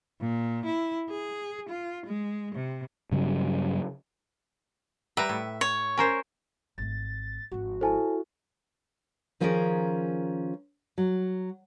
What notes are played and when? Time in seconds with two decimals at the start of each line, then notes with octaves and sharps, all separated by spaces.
0.21 A#2
0.65 E4
1.10 G#4
1.69 F4
2.06 G#3
2.55 C3
3.12 G2 C#3 F#3 G3
5.17 G3 B4 E5 A#5
5.29 A2
5.61 C#5
5.98 C#4 A#4 C5
6.78 G#1 A3 A6
7.51 G#1 F3 F#4
7.81 E4 A4 C5 G#5 A5
9.40 D#3 F3 C#4 F4 G#4 A#4
10.98 F#3